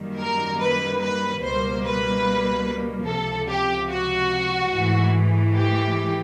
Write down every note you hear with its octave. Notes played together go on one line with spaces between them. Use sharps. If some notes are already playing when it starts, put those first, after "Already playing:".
Already playing: F#2 D#3 G3 A#3
A#4
B4
B4
C#2 B2 G3 A#3 C5
B4
C#2 C3 F3 A4
G4
F#4
G#2 E3 A3
G4